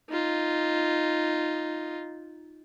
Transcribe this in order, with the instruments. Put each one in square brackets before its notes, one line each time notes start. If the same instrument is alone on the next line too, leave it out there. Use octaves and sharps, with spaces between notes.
[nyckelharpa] D#4 F4